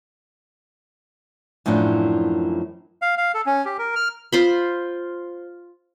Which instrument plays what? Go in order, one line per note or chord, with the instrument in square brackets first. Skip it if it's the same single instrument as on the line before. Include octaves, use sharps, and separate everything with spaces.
[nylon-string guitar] F#2 A2 E3 F3 D4
[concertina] F5
F5
A4
C#4
G4
A#4
F6
[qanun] F4 C5 B5